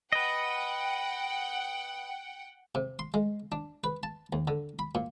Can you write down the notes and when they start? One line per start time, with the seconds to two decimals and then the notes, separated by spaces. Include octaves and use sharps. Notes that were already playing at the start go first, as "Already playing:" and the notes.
0.12 B4 D#5 F#5 G5
2.75 C3
2.99 C6
3.14 G#3
3.52 D4
3.84 B4
4.03 A5
4.33 D#2
4.48 D3
4.79 B5
4.95 A#2